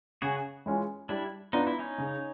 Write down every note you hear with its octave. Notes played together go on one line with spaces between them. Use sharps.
C#3 F#4 G#4
E3 G#3 C#4 F4
G3 D4 E4
B3 D4 D#4 F4
E4
C#4 D#4
C#3